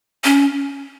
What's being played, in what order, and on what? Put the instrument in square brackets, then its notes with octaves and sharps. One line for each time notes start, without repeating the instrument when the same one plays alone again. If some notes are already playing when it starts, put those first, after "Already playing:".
[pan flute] C#4